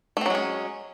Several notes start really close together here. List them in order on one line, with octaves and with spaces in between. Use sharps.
A3 C4 F#3 G#3 C#4